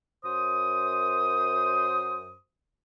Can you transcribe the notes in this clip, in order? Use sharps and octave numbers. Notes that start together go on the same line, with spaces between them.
F#2 C5 D#6